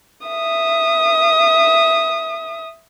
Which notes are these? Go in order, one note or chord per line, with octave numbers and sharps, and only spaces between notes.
E5 D#6